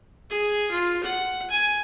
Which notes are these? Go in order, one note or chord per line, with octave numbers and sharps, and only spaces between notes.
G#4
F4
F#5
G#5